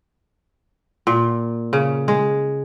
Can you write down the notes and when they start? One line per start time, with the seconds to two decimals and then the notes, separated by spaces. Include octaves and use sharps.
1.07 A#2
1.73 C#3
2.08 G#3